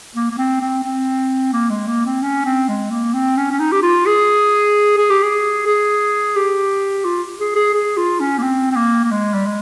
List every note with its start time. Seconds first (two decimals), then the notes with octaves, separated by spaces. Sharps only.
0.15 A#3
0.31 A#3
0.38 C4
0.61 C4
0.84 C4
1.53 A#3
1.70 G#3
1.88 A#3
2.06 C4
2.22 C#4
2.45 C4
2.69 G#3
2.91 A#3
3.14 C4
3.37 C#4
3.51 C#4
3.60 D#4
3.72 G4
3.83 F4
4.06 G#4
4.97 G#4
5.11 G4
5.23 G#4
5.67 G#4
6.36 G4
7.05 F4
7.40 G#4
7.56 G#4
7.74 G#4
7.97 F4
8.20 C#4
8.38 A#3
8.43 C4
8.72 C4
8.76 A#3
9.04 A#3
9.11 G#3
9.34 G3
9.46 G#3